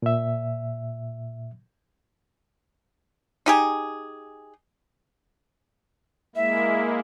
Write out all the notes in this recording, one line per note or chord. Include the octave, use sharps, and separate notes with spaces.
A#2 E5
D#4 G4 G#4
G#3 A#3 E4 E5